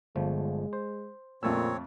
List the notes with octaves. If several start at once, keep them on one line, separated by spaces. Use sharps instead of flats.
G1 F3 G#3 A3
C5
F2 A#2 C#3 A3 C4 C#5 E6